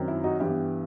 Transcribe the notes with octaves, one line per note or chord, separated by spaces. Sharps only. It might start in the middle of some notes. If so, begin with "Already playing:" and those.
Already playing: F#2 D#3 F#3 C4
E4
D#4 F#4
G2 E3 B3 E4 G4